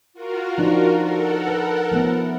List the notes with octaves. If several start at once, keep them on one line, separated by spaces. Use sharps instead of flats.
F4 F#4 A#4
F3 D4 D#4
A4 A#4 F#5
B4
F3 A3 B3